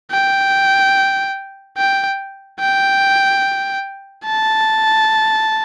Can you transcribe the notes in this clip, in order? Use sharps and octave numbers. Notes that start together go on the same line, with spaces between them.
G5
G5
G5
A5